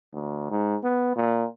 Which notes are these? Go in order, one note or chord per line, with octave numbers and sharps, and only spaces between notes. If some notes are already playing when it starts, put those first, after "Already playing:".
D2
G#2
B3
A#2